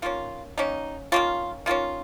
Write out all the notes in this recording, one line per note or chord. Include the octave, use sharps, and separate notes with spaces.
D#3 A#3 C#4 F4
D#3 A#3 C#4 D#4
D#3 A#3 C#4 F4
D#3 A#3 C#4 F4